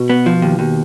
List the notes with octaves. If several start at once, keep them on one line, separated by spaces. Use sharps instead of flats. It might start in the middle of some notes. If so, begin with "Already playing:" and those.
Already playing: B2
B3
F3
D#2
D#2